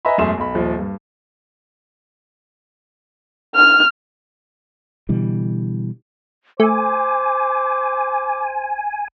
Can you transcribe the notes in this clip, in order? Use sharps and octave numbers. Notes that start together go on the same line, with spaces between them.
B4 D#5 E5 G#5 A#5 B5
E1 F#2 A3 G#4 C6 E7
B1 B5
D#1 F3
G2
F6
B2 D3 E3 G3
A3 C5 G#5 D6